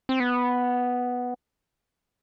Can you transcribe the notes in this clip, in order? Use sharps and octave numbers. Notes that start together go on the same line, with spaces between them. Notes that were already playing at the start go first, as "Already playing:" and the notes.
C4
B3